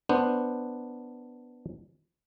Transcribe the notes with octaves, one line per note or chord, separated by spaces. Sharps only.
B3 D4 C5